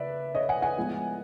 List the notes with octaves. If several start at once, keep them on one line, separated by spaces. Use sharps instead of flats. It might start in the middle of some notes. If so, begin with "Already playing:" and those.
Already playing: C#3 B4 D5 E5
C#5 D#5
F#5 G#5
F#5 G#5
A2 F3 G#3 B3